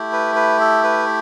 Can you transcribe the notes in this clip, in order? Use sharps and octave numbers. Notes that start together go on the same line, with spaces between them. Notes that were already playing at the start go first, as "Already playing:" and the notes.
Already playing: A3 E4 G4
B4
B4
A4
B4